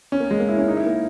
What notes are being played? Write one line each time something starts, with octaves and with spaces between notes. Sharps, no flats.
C#4
A#3
G#3
A#3
E4
C#4
D#4
E4
A#3